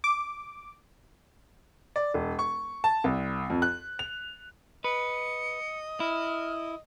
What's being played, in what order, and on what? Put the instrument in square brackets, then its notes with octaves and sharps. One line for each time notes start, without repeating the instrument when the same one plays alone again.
[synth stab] D6
[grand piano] D5
E1
C#6
A5
C2
F2
F#6
F7
[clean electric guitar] B4 [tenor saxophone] D#5 [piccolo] C#7
[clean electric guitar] E4 [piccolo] F6